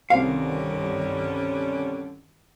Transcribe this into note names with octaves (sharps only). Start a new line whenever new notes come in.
C2 G2 D3 D#3 G3 C4 C#4 F5